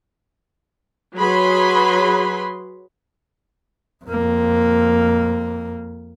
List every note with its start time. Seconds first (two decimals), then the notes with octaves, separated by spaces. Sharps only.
1.17 F#3 G#4 B4 B5 C6
4.05 F2 A#3